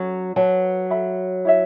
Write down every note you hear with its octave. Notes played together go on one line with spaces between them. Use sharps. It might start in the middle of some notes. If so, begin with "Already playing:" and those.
Already playing: F#3 C#4 A4 C#5
F#3 B4 A5
A4 E5 B5
E4 C#5 E5